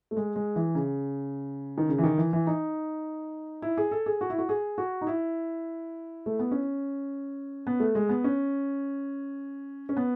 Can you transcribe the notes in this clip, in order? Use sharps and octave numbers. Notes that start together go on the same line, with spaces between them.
A3
G#3
G#3
E3
C#3
D#3
C#3
E3
D#3
E3
E3
D#4
E4
G#4
A4
G#4
F#4
E4
F#4
G#4
F#4
D#4
E4
A3
B3
C#4
B3
A3
G#3
B3
C#4
C#4
B3